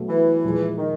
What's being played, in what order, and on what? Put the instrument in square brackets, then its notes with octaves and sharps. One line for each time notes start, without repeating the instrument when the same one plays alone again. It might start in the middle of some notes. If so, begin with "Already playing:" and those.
Already playing: [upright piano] B2 F#3 A3
[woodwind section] E3
[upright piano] A#2 F3 G#3
[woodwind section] D#3